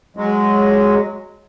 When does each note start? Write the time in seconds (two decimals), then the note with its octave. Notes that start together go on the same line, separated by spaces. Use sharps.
0.17 F#3 G#3